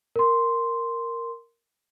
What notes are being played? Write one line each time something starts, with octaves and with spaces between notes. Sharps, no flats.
A#4 C6